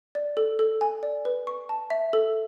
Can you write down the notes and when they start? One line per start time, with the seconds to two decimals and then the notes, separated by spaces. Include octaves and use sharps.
0.15 D5
0.37 A4
0.59 A4
0.81 G#5
1.03 D5
1.25 B4
1.47 C#6
1.69 A5
1.90 E5
2.13 A4